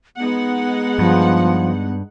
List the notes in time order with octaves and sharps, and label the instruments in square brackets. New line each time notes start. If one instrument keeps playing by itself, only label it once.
[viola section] G#3 D#4 F#5 [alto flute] B3
[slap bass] G2 [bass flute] F3